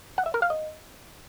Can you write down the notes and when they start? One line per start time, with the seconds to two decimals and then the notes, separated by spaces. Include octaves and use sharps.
0.18 F#5
0.26 E5
0.34 A#4
0.42 F5
0.50 D#5